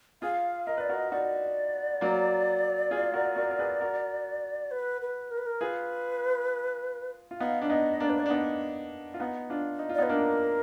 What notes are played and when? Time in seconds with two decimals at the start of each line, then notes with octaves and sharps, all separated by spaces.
0.22 F4 G#4 F5
0.67 A#4 D#5
0.78 B4 D5
0.89 F#4 A#4
0.94 D#5
1.12 D#4 F#4 D5
2.01 F#3 A#3
2.91 F4 G#4
3.14 F#4 A#4
3.36 F#4 A#4
3.51 A#4
3.59 G#4 B4
3.81 F#4 A#4
4.71 B4
5.02 B4
5.31 A#4
5.38 B4
5.46 A#4
5.61 F4 G#4 B4
7.31 F4
7.40 B3 D#4 F5
7.62 D4 F5
7.70 B3 D#4 D#5
8.00 A#3 D4 D5
8.10 B4
8.20 D5
8.26 D4
8.30 B3 D#4
9.14 F4
9.19 B3 D#4
9.50 D4 F4
9.79 D#4
9.89 F4
9.95 D5
9.98 B3 D#4
10.03 B4
10.09 A#3 D4 A#4